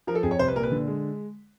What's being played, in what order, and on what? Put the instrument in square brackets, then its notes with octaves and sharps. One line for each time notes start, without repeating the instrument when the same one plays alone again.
[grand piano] F3 A#4
A4
F2 G#4
C#5
C2 C5
B4
A#2 A#4
B4
D3
G#3